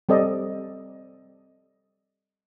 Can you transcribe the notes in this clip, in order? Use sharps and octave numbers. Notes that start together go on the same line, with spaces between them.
G3 C4 A4 D5 D#5